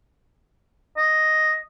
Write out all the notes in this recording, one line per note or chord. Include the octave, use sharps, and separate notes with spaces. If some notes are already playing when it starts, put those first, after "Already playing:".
D#5